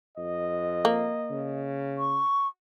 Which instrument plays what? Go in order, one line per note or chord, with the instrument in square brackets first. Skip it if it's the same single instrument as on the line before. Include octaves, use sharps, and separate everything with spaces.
[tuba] F2 [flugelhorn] D#5
[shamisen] A#3
[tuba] C#3
[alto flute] C#6